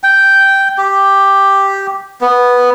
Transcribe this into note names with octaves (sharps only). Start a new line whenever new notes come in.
G5
G4
B3